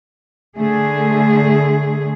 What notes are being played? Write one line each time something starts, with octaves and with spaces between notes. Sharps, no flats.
D3 A3 G#4